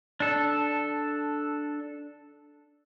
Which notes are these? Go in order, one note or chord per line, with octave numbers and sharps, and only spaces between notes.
D4 A4